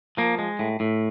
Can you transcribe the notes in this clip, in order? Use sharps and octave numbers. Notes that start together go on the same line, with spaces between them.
F3 A#3
G#3
A2
A2